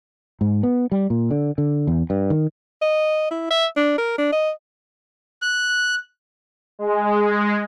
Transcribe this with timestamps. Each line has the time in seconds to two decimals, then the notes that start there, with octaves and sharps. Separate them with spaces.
0.41 G#2
0.63 B3
0.92 G3
1.10 A#2
1.31 D3
1.58 D3
1.87 E2
2.10 G2
2.30 D#3
2.82 D#5
3.31 E4
3.50 E5
3.77 D4
3.98 A#4
4.18 D4
4.32 D#5
5.42 F#6
6.79 G#3